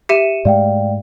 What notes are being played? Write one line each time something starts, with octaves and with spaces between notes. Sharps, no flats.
G4 E5 C#7 D#7 E7
G#2 G#3 A3 D5 F5 G5